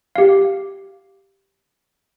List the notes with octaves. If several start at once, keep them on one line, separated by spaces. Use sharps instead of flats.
G4 F5